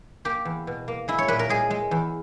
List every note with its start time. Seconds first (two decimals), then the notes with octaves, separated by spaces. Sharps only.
0.25 A#3 G4
0.45 E2
0.67 B2
0.88 A#3
1.08 G#3 E4
1.18 C#5
1.28 A#2 B4
1.39 A#4
1.49 G#3 G#4
1.70 G#3
1.91 E2